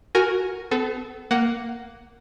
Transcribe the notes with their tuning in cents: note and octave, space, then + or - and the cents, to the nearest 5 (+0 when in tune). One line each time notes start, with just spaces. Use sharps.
F#4 +0 A#4 +0 G#5 +0
B3 +40 A4 -20
A#3 +0 F#5 +10